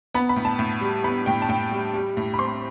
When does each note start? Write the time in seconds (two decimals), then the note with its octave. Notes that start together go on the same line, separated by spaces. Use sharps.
0.14 B3 B5
0.29 B5
0.36 A2
0.45 A5
0.59 A2
0.81 G3
1.04 B3 B5
1.26 A2 G5
1.42 A5
1.49 A2 G5
1.71 G3
1.94 G3
2.17 A2
2.34 B5
2.39 C4 C6